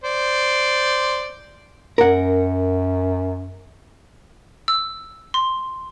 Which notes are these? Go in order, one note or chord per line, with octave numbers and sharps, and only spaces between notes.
C5 D5
F#2 A#4 F#5
E6
C6